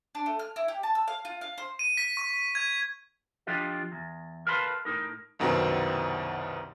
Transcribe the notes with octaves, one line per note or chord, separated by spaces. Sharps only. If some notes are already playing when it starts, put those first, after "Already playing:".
D4
A3
F6
E4
G4
A5
E6
F5
F4
F5
C5
D#7
B6
C#6
G#6
F3 D4 F4 G4 D#5
E2
A#4 B4 F5 A5 B5 C6
A2 D#4 A#4
C2 F#2 B2 D#3 B3 C4